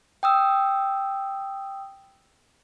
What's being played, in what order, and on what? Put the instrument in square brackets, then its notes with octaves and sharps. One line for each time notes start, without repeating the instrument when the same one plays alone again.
[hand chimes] G5 D#6 E6